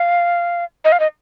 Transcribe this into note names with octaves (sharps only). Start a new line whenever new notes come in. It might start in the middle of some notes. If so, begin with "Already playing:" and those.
Already playing: F5
D#5
F5
D#5